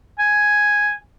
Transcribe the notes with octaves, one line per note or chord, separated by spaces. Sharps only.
G#5